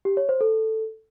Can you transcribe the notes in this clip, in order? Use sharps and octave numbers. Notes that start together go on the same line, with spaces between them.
G4
C#5
C5
A4